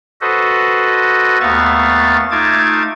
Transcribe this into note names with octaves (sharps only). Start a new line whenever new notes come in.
F#4 A4 B4 C5 D#5
D#2 A3 B3 F5 C#6 A6
A3 D#4 F4 A5 D6 G#6